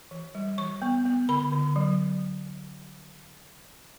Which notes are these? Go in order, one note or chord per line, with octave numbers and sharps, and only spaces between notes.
E3
G3
E3 C#6
B3
B3
D3 B5
D3
F#3